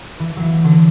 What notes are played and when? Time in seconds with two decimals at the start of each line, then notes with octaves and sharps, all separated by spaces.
0.19 E3
0.37 F#3
0.42 E3
0.64 D3 F#3